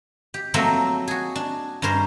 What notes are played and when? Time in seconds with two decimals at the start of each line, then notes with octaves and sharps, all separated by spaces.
0.34 G4
0.54 F3 F#3 A3 A#3 C4
1.08 F#4 G#4
1.36 D4
1.82 G2 C#4 A#4 C5